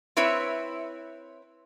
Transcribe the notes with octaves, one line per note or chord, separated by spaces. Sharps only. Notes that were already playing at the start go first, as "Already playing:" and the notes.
C4 E4 B4 C#5 E5